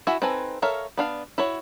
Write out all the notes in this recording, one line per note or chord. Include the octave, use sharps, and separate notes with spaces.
E4 F#4 E5 G#5
C4 D#4 A4 B4 G#5
A4 A#4 C#5 E5 F5
B3 D4 F5
E4 F#4 C#5